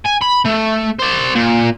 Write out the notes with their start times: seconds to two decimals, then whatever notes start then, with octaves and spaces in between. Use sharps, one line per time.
0.05 G#5
0.21 B5
0.45 A3
0.99 C5 D5
1.35 A#2